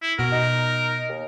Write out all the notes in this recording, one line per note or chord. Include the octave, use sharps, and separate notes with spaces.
E4
B2 F#4 A#4
D#4
D#2